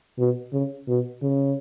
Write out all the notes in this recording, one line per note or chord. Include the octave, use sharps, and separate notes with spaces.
B2
C#3
B2
C#3